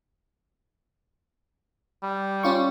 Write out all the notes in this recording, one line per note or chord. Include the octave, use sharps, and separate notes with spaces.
G3
C#4 F4 C#6